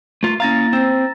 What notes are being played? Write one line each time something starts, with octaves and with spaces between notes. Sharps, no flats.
A3 F4
A#3 C#4 E4 F5 A#5 A6 A#6
C4 C5 E6